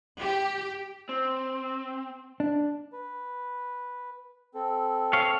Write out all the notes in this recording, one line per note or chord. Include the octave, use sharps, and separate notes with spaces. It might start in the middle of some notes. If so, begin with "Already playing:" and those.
G4
C4
D4
B4
C4 A4
C#5 F5